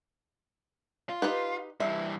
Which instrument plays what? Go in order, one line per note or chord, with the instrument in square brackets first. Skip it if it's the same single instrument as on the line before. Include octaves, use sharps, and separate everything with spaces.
[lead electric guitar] F4
[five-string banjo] D#4 G4 B4
[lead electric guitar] G2 E3 [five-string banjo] E5